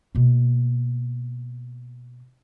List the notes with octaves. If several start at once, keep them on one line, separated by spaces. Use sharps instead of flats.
B2 A#3